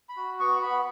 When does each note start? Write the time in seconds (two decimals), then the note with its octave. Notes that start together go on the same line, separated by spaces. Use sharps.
0.09 B5
0.17 F#4
0.39 B3 C#6
0.62 B3 B5